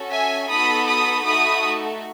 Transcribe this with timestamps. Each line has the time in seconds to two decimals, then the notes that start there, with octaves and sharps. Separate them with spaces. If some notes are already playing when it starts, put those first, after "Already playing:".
Already playing: C#4 F#4 A4
0.11 E5 G#5
0.49 B3 D#4 F#4 A4 B5 D#6
0.87 B5 D#6
1.25 A3 D#4 F#4 A4 B5 D#6